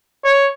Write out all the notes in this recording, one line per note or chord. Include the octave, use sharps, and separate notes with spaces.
C#5